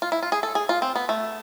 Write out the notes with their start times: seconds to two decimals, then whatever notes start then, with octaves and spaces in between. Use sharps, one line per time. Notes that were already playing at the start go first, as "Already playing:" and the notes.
0.02 F4
0.12 E4
0.23 F4
0.32 G#4
0.43 A4
0.55 G#4
0.69 F4
0.82 C4
0.95 B3
1.09 A3